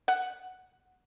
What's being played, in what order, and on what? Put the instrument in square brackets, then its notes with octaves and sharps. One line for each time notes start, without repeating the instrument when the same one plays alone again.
[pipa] F#5